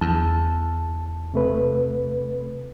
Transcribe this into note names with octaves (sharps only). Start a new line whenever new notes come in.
E2 A5
C3 A3 B4